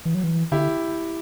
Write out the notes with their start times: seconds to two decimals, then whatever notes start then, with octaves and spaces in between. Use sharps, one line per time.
0.05 E3
0.15 F#3
0.24 E3
0.52 D3 E4 G4